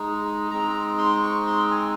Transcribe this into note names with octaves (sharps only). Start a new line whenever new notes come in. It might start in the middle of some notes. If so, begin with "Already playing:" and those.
Already playing: G#3 D#4
G#3 C4 D#4 A#5
C6
C#6
C6
G#5